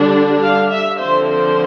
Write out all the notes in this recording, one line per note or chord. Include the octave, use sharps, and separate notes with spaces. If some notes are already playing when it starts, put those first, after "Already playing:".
Already playing: D3 G3 D4
F5
E5
D3 F3 C4 C5
C5